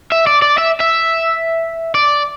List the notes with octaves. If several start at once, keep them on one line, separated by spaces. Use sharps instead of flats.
E5
D5
D5
E5
E5
D5